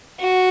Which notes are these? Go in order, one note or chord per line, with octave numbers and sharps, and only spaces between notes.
F#4